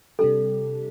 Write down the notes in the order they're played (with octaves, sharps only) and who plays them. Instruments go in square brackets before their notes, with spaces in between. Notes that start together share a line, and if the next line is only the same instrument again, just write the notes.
[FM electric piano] C3 G3 D4 G4 [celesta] A4